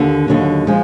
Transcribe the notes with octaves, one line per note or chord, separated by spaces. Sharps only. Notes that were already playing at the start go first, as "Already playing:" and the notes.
Already playing: D#2 D3
D#2 D3 F#3
F3 G#3